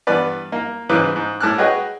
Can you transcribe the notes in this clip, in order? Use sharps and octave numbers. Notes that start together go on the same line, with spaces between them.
G2 E3 B3 B4 D5
A#3
G#2 C#3 E3 B4 D6 F#6
G#2
A2 A5 D6 F6 F#6
F#4 G#4 B4 C#5 D#5 G5